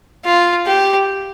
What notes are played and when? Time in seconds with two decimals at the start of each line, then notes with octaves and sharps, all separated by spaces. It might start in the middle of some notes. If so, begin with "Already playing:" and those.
0.25 F4
0.66 G4